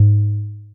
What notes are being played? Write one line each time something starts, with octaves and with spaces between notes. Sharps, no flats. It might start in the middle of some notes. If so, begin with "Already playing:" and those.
Already playing: G#2